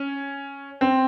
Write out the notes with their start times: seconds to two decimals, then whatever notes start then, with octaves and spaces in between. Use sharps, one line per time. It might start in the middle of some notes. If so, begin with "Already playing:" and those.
Already playing: C#4
0.81 C4